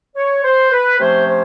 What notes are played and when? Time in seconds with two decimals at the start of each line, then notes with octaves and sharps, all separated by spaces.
0.16 C#5
0.44 C5
0.72 B4
0.99 C3 F3 A3 C#4 C5
1.28 C5